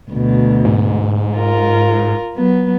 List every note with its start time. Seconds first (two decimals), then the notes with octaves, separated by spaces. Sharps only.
0.10 D2 B2
0.65 G#2
1.35 F4 A#4
2.35 F#3 B3